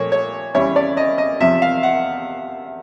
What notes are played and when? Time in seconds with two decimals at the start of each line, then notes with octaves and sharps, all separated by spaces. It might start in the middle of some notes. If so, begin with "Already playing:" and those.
Already playing: A#2 F3 A3 C#5
0.12 C#5
0.54 E2 C#3 E3 G3 C#5
0.76 D5
0.97 D#5
1.18 D#5
1.40 E2 C3 F3 E5
1.62 F5
1.83 F#5